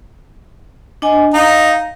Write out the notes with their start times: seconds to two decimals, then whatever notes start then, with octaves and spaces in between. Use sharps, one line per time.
1.02 D4 D#5 G#5
1.34 D#4 F5